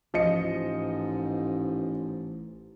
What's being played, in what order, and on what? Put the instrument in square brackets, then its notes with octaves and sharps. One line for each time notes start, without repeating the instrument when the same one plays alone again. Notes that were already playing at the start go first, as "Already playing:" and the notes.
[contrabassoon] A1 [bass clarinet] G#2 [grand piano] F3 D#5 C#7